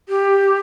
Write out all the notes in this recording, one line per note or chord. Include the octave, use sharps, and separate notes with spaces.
G4